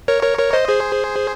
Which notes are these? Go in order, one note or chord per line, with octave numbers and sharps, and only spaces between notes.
A#4 C#5
A#4 C#5
A#4 C#5
C5 D#5
G#4 C5